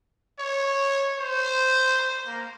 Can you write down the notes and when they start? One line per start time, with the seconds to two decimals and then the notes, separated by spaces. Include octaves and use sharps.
0.39 C#5
1.18 C5
2.26 A#3